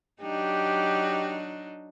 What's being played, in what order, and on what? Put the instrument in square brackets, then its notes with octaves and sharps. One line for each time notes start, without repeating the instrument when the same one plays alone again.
[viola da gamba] F#3 D4 D#4 [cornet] G4